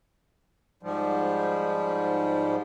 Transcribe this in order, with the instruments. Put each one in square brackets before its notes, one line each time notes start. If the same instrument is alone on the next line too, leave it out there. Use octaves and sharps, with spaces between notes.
[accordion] G#2 F3 G3